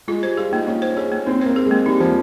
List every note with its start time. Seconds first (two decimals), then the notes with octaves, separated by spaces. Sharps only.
0.08 G#3 F4
0.23 G3 C5
0.37 F4 G#4
0.52 A#3 D#4
0.67 C#4 F4
0.82 C5
0.97 C#4 G#4
1.12 A#3
1.26 C4 D#4
1.41 A#3 C5
1.56 G#4
1.66 G#3 A#3
1.86 G3 D#4
2.00 F3 C5